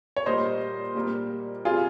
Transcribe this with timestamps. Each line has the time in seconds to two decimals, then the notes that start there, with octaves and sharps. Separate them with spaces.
0.17 C#5
0.26 A#2 G3 A#3 C5 D#5
0.95 A#2 G3 A#3
1.65 C3 G3 F4 G#4